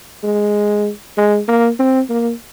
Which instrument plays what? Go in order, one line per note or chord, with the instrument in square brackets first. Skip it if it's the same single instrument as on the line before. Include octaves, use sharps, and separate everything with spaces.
[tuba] G#3
G#3
A#3
C4
A#3